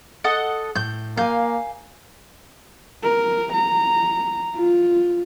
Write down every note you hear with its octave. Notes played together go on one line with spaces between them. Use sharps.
A4 D#5 F#5
A2 G6
A#3 F5 G#5 G6
A#4
A#5
F4